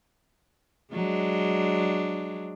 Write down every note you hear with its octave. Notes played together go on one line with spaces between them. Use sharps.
F#3 G#3 D4